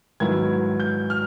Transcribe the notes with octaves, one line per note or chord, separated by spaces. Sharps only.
G#2 D#3 F#3 B3 E4 G#6
G6
F6